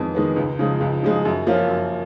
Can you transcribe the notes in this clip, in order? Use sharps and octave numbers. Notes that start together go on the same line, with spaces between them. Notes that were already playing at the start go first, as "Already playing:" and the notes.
Already playing: F2 D#3 G#3 B3
D#3 G#3 B3
C#2
C#3 F3 G#3
C#2
C#3 F3 G#3
F#2
F3 A#3 C#4 F4
F#2